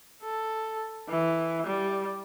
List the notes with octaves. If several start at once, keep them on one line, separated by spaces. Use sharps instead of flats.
A4
E3
G3